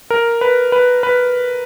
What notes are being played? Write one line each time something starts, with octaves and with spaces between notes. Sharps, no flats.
A#4
B4
B4
B4